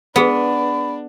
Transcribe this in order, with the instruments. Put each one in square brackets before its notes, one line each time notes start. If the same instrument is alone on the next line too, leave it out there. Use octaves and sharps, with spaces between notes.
[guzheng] B3 [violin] D4 [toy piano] G#4 B4 [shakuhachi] B5